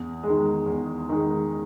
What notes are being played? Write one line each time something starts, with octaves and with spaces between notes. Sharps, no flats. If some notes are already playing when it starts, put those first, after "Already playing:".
Already playing: E2
D#3 G#3
E2
D#3 G#3